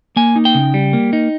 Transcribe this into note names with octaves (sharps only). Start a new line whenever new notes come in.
A#3 G#5
D#4
G5
C#3
G3
A#3
D#4